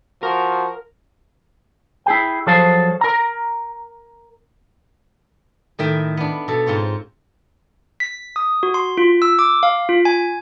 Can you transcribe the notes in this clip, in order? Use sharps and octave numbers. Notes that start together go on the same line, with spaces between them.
F3 F#4 A#4
E4 G#4 G5
F3 F#3 G#4 A4 C5 F5
A#4 A#5
A2 D#3 E5 G5 G#5
B3 D4
B2 A4
G#2 C4 F4 C#5
B6
D#6
F#4
C6
F4
E6
D6
F5
F4
G#5